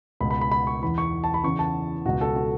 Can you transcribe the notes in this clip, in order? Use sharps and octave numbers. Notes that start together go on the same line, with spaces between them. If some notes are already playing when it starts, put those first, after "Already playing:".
C#2 B2 B5
B5
B5
B5
C#6
E2 E3 B5
C#6
A5
B5
E2 C#3 E3 C#6
A5
C#2 B2 F#4
A4
F#4